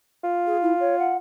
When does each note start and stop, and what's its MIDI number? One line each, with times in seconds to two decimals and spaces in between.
0.24 1.18 65
0.47 0.57 68
0.62 0.74 64
0.80 0.98 73
0.99 1.16 78